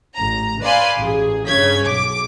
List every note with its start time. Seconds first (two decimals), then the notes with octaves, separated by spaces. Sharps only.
0.14 A1 A#5
0.61 B4 D5 F5 G#5 B5 C6
0.97 A1 G#4
1.47 G2 C#3 C#5 G#6 B6
1.83 B1 D6